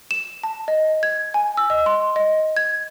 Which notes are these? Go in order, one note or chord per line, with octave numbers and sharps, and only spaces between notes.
E7
A5
D#5
G#6
G#5
E6
D#5
C6
D#5
G#6